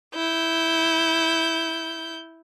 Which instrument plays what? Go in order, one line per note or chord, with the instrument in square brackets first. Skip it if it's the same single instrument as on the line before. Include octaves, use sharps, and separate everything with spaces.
[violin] E4 G6